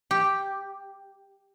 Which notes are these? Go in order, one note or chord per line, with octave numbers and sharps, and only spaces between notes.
G4